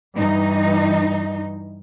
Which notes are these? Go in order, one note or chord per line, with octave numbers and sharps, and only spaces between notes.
G2 E3 D#4